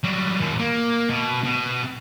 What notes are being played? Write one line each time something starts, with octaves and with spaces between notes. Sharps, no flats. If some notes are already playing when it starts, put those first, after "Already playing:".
F#3 G3
D#2 A#2
A#3
B2
B2